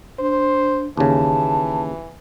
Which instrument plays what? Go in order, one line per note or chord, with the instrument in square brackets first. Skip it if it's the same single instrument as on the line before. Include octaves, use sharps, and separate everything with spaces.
[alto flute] D4 [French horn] C5
[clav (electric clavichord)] D#2 C#3 [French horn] E3 [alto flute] A5